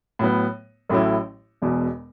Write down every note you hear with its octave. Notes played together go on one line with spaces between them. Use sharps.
A2 F#3 B3
A1 A2 F#3 A3 E4
E1 E2 B2